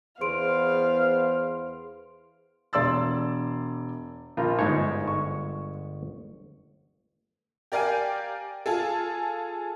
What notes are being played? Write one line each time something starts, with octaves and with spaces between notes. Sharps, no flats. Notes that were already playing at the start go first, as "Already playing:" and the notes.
E2 B3 G#4 C5 F5 C6 D7
E1 D5 C6 E6 A6
A#1 F4 A#4
G1 G#2 G#3 C#5
C#6
G4 A#4 D5 F5 G5 G#5
F4 G#4 A4